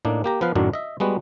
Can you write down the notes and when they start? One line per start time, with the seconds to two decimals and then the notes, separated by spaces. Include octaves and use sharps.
0.05 A2 A#3 D4 D#4
0.24 A#3 G4 A#5
0.41 F3 B3 B4 F5
0.55 F#2 A2 D#3 F#3 D4
0.73 D#5 E5
1.00 G3 G#3 B3 F#4